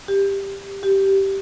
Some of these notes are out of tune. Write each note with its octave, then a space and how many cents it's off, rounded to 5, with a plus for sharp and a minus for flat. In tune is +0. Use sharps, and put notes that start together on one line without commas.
G4 +10
G4 -10